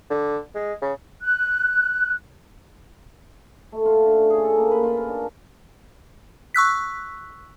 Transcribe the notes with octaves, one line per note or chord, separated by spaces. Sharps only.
D3
G#3
C#3
F#6
A3
F4
D3
C#4
G#4
A4
A#3
B4
F4
A#4
D4
C#6 E6 F#6 B6